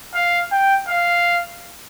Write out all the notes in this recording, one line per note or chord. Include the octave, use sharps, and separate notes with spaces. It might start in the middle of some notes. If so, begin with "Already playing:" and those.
F5
G5
F5